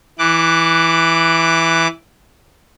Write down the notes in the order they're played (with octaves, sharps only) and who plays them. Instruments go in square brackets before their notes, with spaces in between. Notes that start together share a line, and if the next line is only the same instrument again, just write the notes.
[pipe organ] E3 D6 F#6